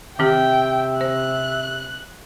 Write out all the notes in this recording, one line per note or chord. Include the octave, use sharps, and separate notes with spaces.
C3 D#3 C4 G4 E5 G5
C5 F#6